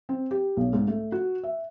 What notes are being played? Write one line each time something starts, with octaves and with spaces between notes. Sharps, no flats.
C4
G4
B1
G#2
A3
F#4
E5